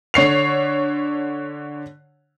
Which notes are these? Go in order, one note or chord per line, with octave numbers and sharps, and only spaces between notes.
D3 C#5 C7 F7